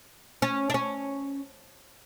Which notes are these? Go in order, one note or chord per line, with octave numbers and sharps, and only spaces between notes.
C#4
D4
C#4